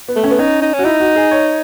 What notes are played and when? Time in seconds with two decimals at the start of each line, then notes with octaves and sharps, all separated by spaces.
0.08 B3
0.16 A3
0.24 C#4
0.31 B3
0.39 C#4 D#4
0.62 D#4
0.74 C#4
0.79 F#4
0.84 D#4 E4
1.00 F#4
1.16 G#4
1.31 C#5